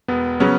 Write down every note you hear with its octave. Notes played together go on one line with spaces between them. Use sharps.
E1 B3
C#3 F#3 B3 C#4